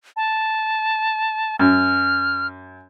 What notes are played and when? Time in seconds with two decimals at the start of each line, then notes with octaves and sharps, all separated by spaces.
0.16 A5
1.59 F#2 F6